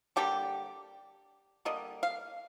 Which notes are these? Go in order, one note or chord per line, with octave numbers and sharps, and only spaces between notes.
D3 G3 A#3 D4 G4
D3 G3 A#3 D#5
F5